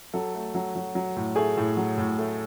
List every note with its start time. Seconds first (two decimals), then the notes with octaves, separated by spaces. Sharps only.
0.14 F#3 A4
0.35 A3
0.55 F#3
0.76 F#3
0.95 F#3
1.16 A2
1.36 A3 G#4
1.57 A2
1.77 F#3
1.98 A2
2.19 A3